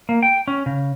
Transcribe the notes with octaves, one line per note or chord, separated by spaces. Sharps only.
A#3
G5
C#4
C#3